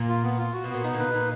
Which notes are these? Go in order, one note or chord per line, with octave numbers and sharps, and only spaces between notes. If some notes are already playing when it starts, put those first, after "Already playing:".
Already playing: A#2
F4
B3
F4
F#4
B2
B3
A#2
B2 D#4
A#2 D3
B4
B2
A#2 D#4